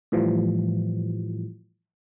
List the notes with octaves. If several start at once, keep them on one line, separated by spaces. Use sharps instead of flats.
A2 E3 F3 G3